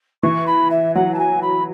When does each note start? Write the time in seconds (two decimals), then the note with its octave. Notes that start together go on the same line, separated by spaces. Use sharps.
0.23 E3 C#6
0.47 B5
0.70 E5
0.95 F#3 F#5
1.14 A5
1.18 G#5
1.42 B5